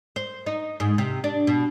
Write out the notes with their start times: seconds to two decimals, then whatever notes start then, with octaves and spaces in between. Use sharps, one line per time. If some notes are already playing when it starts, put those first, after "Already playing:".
0.16 C5
0.46 D#4
0.80 G#2
0.98 C3
1.24 D4
1.47 B2